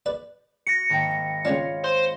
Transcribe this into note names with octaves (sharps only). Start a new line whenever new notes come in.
B4 D5
F#4 A#6 C#7
G#1 A#3 G5
C#2 C#4 D4 F4 C#5 F5
C5